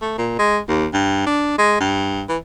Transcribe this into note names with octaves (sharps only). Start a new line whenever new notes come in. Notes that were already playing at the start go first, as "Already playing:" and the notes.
A3
A#2
G#3
D#2
G2
D4
G#3
G2
E3